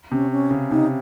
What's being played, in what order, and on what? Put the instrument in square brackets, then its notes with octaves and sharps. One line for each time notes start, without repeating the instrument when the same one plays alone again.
[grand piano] C3 [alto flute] C#4
[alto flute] C#4
[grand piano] C#3
[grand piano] C3 [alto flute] D#4